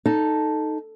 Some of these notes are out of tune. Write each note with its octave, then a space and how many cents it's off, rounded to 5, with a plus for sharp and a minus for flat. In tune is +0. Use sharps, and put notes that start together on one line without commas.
D#4 +0 A4 +0